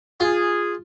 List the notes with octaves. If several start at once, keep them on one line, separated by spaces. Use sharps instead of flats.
F4 G#4